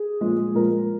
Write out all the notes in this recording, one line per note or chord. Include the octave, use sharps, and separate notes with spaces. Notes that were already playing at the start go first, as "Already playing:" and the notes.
Already playing: G#4
A#2 F3 G#3
A#2 F3 G#3 A#4